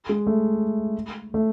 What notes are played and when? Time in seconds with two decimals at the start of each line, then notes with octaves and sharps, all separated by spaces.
0.09 G#3
0.27 A3
1.34 A3